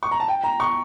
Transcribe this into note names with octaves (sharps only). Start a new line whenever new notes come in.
C#6
A#5
A5
G5
A#5
C#6